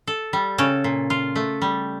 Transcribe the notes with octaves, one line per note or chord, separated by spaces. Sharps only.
A4
G3
C#3 C#4 A4
A#2
F4
A3
G3